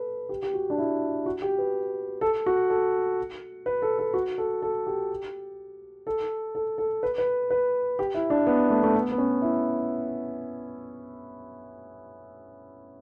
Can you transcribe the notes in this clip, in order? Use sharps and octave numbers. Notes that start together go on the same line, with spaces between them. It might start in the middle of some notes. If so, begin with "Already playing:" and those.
Already playing: A4 B4
G4
G4
F#4
D4
E4
F#4
G4
B4
A4
F#4
A4
B4
A4
A4
F#4
A4
A4
G4
A4
A4
A4
B4
B4
B4
G4
E4
D4
B3
A3
A3
B3
B3
C#4
E4